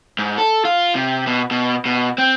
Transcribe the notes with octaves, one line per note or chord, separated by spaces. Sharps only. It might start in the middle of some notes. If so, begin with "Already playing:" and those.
G#2
A4
F4
C3
B2
B2
B2
C4